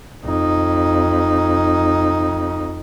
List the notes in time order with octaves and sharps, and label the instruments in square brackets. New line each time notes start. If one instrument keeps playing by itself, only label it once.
[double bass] F2 D#4